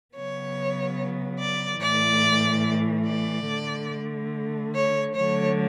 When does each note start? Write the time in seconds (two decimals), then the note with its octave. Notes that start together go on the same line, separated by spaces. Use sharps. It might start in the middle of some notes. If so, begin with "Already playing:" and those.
0.15 C#3 F#3 B3 C#5
1.40 D5
1.81 A2 E3 A3 D5
3.06 D5
3.48 D3 A3
4.74 C#5
5.15 D3 F#3 A3 C#5